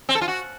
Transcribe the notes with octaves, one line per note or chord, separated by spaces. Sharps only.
C4
A4
F4
F#4